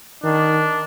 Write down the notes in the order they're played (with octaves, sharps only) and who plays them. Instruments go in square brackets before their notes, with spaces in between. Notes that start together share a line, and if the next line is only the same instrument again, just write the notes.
[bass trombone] D#3 [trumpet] D4